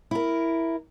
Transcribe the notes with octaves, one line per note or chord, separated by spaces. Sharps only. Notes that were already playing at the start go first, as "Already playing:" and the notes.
E4 A#4